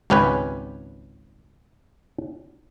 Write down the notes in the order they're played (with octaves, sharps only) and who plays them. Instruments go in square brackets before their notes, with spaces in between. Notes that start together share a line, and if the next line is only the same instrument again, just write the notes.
[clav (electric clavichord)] G#1 C#2 C#4 G4 B4 G#5